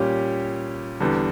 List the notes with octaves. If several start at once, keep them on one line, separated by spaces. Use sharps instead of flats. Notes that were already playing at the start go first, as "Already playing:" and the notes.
Already playing: A#2 G3 C#4 G4
E2 D3 G3